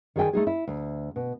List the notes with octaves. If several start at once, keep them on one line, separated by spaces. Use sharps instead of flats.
D#3 G#4 D5 G5 G#5
A3 D#4 G#4
E4
D2
B2